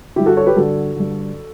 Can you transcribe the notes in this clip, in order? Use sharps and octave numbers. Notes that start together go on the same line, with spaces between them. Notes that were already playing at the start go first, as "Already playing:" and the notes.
G2 D3 E4 G4
F#4 A4
A4 C#5
G4 B4
G2 D3 F#4 A4
G2 D3